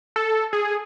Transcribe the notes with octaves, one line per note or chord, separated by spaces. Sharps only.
A4
G#4